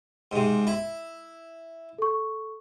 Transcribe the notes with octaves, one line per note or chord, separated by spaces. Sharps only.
G#2 C3
E4
A4 C#6